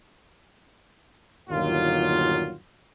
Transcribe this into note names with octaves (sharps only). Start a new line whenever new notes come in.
G1 D#2 A#2 F#3 F4